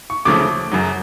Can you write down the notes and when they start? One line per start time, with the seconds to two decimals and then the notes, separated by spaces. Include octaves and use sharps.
0.10 C#6
0.25 D2 C#3 F3 A3 D6
0.72 F#2 C#3 F#3